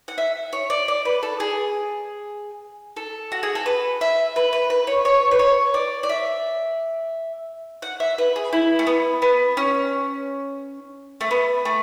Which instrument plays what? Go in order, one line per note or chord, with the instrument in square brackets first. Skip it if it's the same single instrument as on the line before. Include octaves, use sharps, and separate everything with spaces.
[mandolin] F#5
E5
C#5
D5
D5
B4
A4
G#4
A4
F#4
G#4
A4
B4
E5
B4
B4
B4
C#5
C#5
B4
C#5
D5
D5
E5
F#5
E5
B4
G#4
E4
A3
B3
B3
C#4
A3
B3
A3